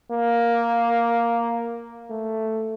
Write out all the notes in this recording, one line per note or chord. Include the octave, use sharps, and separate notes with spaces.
A#3
A3